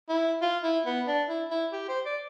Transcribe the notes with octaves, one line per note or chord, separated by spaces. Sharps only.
E4
F4
E4
B3
D4
E4
E4
G4
C5
D5